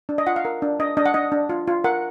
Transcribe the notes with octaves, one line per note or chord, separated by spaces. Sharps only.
D4
D#5
F4 F#5
F5
A#4
D4
D4 D#5
D4 D#5
F#5
D4 D#5
D4
F4
F4
A#4 F#5